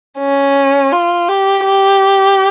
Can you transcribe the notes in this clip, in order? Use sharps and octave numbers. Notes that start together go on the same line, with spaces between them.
C#4
F4
G4
G4